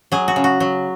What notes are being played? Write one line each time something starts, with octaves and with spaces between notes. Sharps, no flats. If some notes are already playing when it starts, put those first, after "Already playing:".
F#3 G#4
F#4
C#3
F#4
F#3